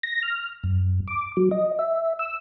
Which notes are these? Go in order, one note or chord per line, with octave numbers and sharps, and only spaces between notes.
A#6
F6
F#2
D6
F#3
D#5
E5
E6